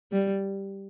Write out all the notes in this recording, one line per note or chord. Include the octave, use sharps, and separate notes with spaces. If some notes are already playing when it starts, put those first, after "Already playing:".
G3